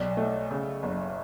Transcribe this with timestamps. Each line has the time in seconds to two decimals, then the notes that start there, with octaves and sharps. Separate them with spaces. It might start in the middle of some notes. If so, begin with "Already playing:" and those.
Already playing: B1 D5
0.17 A3
0.51 C#3
0.83 F#1